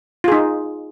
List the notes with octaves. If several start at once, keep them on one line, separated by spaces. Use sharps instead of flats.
D#4 F4 G#4